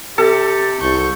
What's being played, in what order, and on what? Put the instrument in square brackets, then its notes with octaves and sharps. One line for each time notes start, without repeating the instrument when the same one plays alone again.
[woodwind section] C3 G4 [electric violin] C4 [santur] A4
[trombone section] C2 [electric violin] C#6 G6